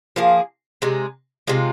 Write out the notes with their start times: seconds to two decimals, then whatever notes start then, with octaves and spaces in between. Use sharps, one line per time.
0.16 F3 A#3 G#4
0.82 C3 G#3 D#4
1.47 C3 G#3 F4